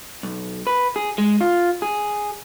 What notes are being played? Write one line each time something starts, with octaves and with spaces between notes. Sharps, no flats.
B1
B4
G#4
G#3
F4
G#4